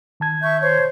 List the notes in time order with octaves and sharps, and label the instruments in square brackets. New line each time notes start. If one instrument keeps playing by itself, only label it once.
[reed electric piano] D#3 A5 G#6
[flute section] E5 C#6 [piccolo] G6
[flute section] C5 C#5